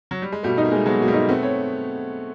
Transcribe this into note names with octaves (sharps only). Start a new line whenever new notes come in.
F#3
G3
G#3
B2 G3 A3
D#4
A#3
G#3 A3
F#3 G#3 B3
B2 A#3
G3 A3
D#4
A3 B3 C4
C#5